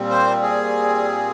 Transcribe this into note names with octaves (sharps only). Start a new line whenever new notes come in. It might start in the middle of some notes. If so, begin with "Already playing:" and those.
Already playing: A#2 G3 C4
C5
G#4